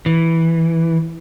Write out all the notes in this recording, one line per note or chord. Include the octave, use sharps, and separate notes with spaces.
E3